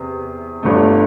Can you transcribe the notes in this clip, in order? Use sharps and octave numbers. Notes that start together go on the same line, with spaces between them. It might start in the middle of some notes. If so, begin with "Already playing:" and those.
Already playing: E2 C3
G1 G2 D3 A3